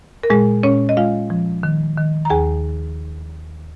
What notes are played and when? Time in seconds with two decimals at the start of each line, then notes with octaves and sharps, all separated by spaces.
0.23 A#4
0.30 A#2 G#3 G#4
0.63 A#2 C#4 C#5
0.89 D#5
0.97 G#3 F4 F5
1.30 F3
1.63 D#3
1.97 D#3
2.25 A#5
2.30 D#2 G#4 G#5